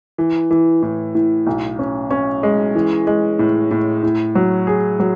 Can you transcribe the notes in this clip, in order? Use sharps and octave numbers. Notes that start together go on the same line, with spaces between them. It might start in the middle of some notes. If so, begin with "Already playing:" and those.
E3
E3
A2
A2
B1
C#4
C#4
G#3
E3
G#3
A2
A2
A2
F#3
G#4
F#3